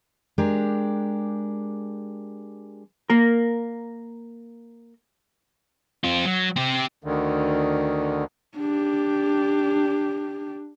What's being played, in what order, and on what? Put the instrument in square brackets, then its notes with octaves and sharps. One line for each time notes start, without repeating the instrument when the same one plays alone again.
[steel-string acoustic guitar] G#3 D4 G4 A#4
[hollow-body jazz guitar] A#3 A#4
[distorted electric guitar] C4 F4
F#3
C4 G4
[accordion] D2 D3 D#3
[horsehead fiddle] D4 G4